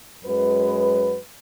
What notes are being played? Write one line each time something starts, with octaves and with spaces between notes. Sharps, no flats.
F#2 F#3 G#3 B4